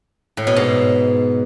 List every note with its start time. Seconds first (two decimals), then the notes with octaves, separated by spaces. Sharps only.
0.37 A2
0.47 B2
0.56 G#2